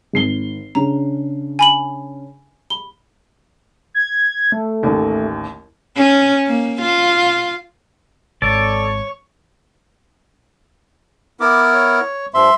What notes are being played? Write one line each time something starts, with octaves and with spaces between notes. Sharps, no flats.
G#1 C7 G7
C#3 C#4 D4 A#5
G#5 B5 F#7
B5 G7
G#6
A3
A1 D#2
C#4
A#3
F4
G#1 A4 C#5 D5
B3 E4 A#4 D6
C#5
G2 F3 E5 C6